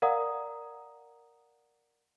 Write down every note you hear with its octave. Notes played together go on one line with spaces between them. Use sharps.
A#4 D5 F5 F#5 A#5 D#6